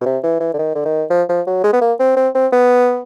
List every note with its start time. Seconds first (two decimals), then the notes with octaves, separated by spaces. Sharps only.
0.01 B2
0.06 C3
0.23 E3
0.40 E3
0.54 D3
0.59 D#3
0.75 D3
0.85 D#3
1.11 F3
1.29 F3
1.47 F#3
1.64 G#3
1.73 B3
1.81 A#3
2.00 C4
2.17 C4
2.35 C4
2.52 B3